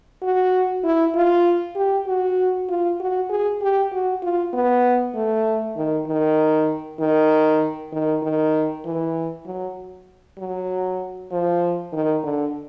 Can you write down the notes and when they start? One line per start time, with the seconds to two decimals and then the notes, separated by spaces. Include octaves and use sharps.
0.22 F#4
0.84 E4
1.15 F4
1.76 G4
2.07 F#4
2.69 F4
3.00 F#4
3.30 G#4
3.61 G4
3.92 F#4
4.22 F4
4.53 B3
5.15 A3
5.77 D#3
6.07 D#3
7.00 D#3
7.92 D#3
8.22 D#3
8.85 E3
9.46 F#3
10.38 F#3
11.31 F3
11.93 D#3
12.23 D3